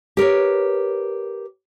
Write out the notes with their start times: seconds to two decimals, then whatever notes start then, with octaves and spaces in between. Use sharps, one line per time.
0.17 G4 A#4 B4 C#5